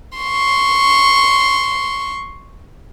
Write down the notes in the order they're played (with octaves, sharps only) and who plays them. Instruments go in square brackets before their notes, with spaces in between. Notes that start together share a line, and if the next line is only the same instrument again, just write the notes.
[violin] C6 C#6